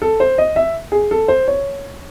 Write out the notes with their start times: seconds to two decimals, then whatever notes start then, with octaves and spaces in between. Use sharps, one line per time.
0.02 A4
0.20 C5
0.38 D#5
0.56 E5
0.92 G#4
1.11 A4
1.28 C5
1.48 C#5